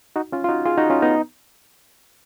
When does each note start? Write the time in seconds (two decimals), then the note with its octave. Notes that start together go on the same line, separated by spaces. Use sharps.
0.16 D#4 F#4
0.32 C#4 F4
0.44 F4
0.49 D#4 F#4
0.65 F4 G#4
0.78 D#4 F#4
0.90 C#4 F4
1.02 B3 D#4